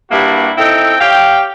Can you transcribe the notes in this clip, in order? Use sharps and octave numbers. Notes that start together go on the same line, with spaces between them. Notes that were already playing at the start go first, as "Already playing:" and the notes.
G2 G3 A#3 E4 F#4
C4 D#4 E4 A4 G5
G4 C#5 F5 G5